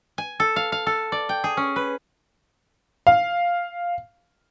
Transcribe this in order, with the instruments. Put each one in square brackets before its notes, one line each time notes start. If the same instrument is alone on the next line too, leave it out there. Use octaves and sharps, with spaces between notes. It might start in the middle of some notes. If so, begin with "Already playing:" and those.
[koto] G#5
A4
F5
F5
A4
D5
G5
G#4
C#4
B4
[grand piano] F5